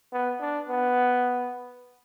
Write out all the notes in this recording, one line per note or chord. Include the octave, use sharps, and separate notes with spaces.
B3
D4
B3